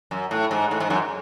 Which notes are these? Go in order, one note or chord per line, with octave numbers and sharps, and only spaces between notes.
F#2
A2
G#2
A2
G#2
F#2